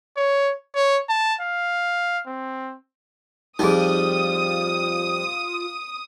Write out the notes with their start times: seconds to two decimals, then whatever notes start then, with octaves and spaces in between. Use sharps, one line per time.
0.17 C#5
0.75 C#5
1.09 A5
1.41 F5
2.26 C4
3.59 F2 G3 D#4 F4 G#4 D#6